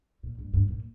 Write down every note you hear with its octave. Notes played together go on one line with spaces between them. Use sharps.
A#2
G2
G2
A#2